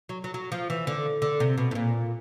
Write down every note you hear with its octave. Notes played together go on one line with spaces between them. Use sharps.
F#3
F#3
F#3
F3
E3
D3
D3
C3
B2
A2
A#2